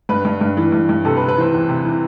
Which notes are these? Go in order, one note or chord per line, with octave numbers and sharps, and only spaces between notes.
G2 B4
G2
G2
E3
G2
G2
C3 A4
B4
C3
B4
E3 C5
E2
C3
E3